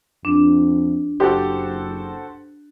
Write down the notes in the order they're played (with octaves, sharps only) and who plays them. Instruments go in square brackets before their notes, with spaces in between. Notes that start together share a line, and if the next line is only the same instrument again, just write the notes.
[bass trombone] F2 [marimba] D4
[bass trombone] F#1 [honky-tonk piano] F#4 A4 C5 [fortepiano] G4